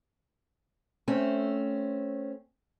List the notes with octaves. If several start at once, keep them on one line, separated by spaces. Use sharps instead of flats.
A3 C4 C#4